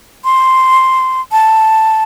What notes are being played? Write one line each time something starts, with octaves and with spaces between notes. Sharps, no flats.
C6
A5